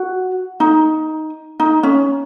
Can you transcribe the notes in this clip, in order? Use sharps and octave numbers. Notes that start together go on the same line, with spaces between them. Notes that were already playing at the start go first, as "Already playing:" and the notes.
Already playing: F#4
D#4
D#4
C#4